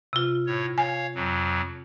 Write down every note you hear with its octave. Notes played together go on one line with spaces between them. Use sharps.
C3 F4
A2 C#5
C#5 F5 G#5
F2 F#3